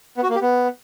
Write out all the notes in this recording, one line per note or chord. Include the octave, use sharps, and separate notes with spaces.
B3
F#4
A#3
G4
B3